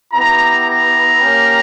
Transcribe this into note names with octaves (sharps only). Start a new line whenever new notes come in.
B3 E4 G4 A#5
A#5
A#3 C#4 G4